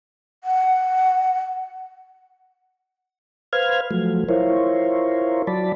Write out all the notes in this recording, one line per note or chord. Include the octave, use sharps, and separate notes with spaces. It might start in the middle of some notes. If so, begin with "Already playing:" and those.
F#5
B4 C5 F5 F6 G#6
F3 F#3 A3
E4 F4 A#4 C5 C#5
F#3 D5 A5 B5